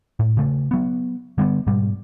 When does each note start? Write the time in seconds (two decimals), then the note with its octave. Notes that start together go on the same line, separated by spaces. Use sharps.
0.19 A2
0.37 C#3 A3
0.71 F#3 B3
1.38 D3 G3 G#3 B3
1.67 G#2 B2 G3